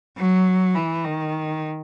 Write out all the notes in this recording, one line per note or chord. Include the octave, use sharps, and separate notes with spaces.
F#3
E3
D#3